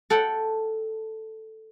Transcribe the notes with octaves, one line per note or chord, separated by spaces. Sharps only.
A4 F#5 G5